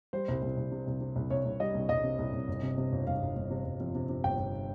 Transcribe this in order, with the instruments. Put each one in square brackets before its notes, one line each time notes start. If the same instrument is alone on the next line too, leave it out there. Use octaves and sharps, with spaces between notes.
[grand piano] G3 C5
C2
C2
C2
C3
C2
C3
C2
C2 C#5
C2
G3 D#5
C2
C2 D#5
C3
C2
C2
G1
C3
C3
G1
G1 F5
G1
G1
C3
G1
F2
C3
C3
G1 G5
G1